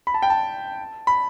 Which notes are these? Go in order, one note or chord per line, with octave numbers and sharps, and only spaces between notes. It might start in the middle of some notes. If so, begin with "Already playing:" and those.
B5
A5
G5
A5
B5